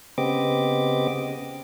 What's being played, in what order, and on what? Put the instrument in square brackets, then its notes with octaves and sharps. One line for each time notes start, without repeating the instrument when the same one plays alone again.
[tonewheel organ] C#3 B3 C4 G4 D#5 D6